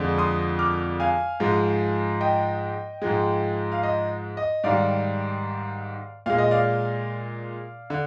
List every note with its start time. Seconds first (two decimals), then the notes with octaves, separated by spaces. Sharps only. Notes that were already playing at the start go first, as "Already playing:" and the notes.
Already playing: F2 D3 F3 G#3
0.18 C6 D#6
0.59 D6 F6
1.00 F5 G#5
1.40 G#2 F3 G#3
2.21 D#5 G5
3.02 G#2 F3 G#3
3.72 F5
3.83 D#5
4.37 D#5
4.64 G#2 D#3 G3 D5 F5
6.26 A#2 G#3 F5
6.39 D#5
6.51 D5 F5
7.90 D3